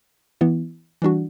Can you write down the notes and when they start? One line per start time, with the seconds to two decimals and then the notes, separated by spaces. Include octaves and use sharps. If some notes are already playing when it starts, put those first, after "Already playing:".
0.41 E3 B3 E4
1.02 E3 G3 D4 F#4